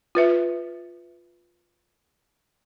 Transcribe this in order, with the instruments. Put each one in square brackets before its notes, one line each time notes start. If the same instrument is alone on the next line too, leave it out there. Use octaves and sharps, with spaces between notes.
[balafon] F4 B4 E5